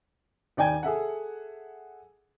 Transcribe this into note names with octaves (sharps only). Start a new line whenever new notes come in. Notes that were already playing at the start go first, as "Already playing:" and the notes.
D#2 D5 G5 G#5 G#6
G#4 A4 E5 F#5